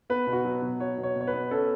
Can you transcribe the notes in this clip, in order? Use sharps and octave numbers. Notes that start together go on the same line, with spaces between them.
B3 B4
B2
F#4
F#3
B2
F#3 C#5
B2
C#5
B2
C#5
B4
B3
C#4 A4